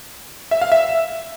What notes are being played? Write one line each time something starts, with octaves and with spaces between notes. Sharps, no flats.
E5
F5
E5